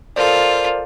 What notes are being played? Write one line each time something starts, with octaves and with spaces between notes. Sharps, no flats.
F4 A4 A#4 C5 D5